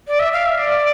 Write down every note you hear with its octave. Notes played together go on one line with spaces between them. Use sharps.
D5
E5
F5
E5
D5